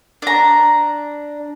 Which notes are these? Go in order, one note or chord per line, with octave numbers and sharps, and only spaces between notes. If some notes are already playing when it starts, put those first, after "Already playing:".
D4 A#5